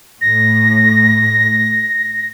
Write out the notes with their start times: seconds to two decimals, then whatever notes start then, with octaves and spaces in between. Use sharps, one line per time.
0.21 A2 A#6